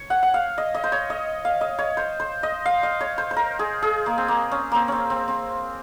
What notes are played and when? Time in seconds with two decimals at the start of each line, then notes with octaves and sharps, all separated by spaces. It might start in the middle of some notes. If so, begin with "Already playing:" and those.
Already playing: C#5
0.10 F#5
0.23 F#5
0.34 F5
0.58 D#5
0.75 D#5
0.84 C5
0.92 C#5
1.10 D#5
1.45 F5
1.61 D#5
1.79 C#5
1.97 C5
2.20 C5
2.43 D#5
2.66 F5
2.83 D#5
3.01 C#5
3.18 C5
3.31 C5
3.36 A#4
3.59 G#4
3.82 G#4
4.06 A#3
4.18 C4
4.28 A#3
4.51 C#4
4.72 A#3 C4
4.88 C4 C#4
5.10 C4
5.28 C4